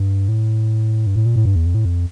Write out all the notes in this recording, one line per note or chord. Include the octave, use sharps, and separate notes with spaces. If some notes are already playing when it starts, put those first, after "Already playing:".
Already playing: G2
A2
G2
A2
A#2
A2
G2
E2
F2
A2
F2